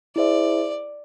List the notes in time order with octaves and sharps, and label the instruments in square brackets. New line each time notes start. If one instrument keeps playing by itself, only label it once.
[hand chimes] E4 G#4 C5 E5 [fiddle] D5